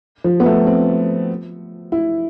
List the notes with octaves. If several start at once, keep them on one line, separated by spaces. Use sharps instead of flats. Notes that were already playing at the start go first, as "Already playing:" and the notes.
F3
B3
A3
C4
E4